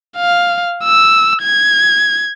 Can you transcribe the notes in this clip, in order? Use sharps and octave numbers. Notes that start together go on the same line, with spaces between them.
F5
E6
G#6